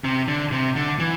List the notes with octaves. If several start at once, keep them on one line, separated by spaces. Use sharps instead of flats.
C3
D3
C3
D3
E3